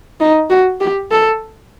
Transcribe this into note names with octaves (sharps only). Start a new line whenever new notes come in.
D#4
F#4
G4
A4